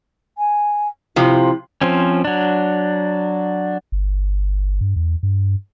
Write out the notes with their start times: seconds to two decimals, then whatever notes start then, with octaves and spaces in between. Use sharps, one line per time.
0.38 G#5
1.16 C3 F3 E4
1.81 F3 C4 C#4
2.25 F#3 D4
3.92 G1
4.81 G2
4.96 E2
5.23 G2